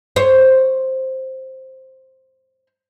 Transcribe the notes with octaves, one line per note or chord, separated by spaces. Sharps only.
C5 C#5